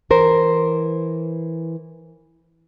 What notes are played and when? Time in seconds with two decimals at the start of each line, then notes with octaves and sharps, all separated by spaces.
0.10 E3 A#4 C5